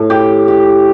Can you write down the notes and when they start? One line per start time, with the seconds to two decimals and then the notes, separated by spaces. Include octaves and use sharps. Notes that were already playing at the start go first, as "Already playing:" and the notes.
Already playing: A2
0.10 G4
0.48 G4